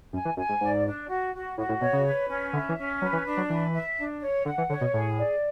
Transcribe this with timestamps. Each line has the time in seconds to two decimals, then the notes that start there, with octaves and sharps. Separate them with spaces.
0.13 F#2 G#5
0.25 E3
0.36 F#2 G#5
0.49 G#2
0.61 G#2 D5
0.85 D4
1.09 F#4
1.33 F#4
1.57 A2 F#4
1.69 A2
1.81 B2 C#5
1.93 C#3
2.05 B4
2.29 C#4
2.53 D3 E5
2.69 E3
2.77 C#4
3.01 F#3 B4
3.13 E3
3.25 D4
3.37 F#3
3.49 E3 B4
3.73 E5
3.97 D4
4.21 C#5
4.45 D3 F#5
4.58 E3
4.70 D3 C#5
4.81 B2
4.93 A2 G#4
5.17 D5